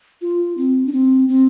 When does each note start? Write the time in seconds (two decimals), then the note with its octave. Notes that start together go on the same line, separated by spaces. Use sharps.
0.22 F4
0.58 C4
0.86 D4
0.93 C4
1.29 C4